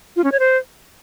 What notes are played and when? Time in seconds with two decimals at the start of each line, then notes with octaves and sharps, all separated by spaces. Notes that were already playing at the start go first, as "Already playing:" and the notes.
0.16 F4
0.24 C#4
0.32 C#5
0.39 C5